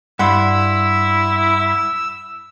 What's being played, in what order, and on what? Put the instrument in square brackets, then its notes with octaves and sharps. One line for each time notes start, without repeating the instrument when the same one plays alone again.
[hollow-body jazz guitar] G2 [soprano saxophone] E4 [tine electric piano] F#5 B5 C6 [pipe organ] E6